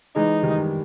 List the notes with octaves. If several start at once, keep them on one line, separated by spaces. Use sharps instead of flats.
E3 G#3 D#4
D#3 G3